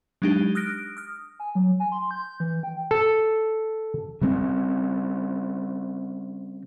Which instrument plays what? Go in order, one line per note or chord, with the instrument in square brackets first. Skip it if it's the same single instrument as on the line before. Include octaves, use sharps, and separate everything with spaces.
[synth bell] F#3 G#3 D4 D#4 G4
D#6 F6 F#6 A#6 D7
D#6 F6
[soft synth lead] G#5
F#3
G#5
C6
G6
E3
G5
[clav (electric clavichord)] A4
[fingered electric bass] C#3 G3 C4